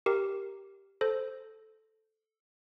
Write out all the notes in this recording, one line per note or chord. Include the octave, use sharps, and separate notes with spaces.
G4 A#4
A4 C5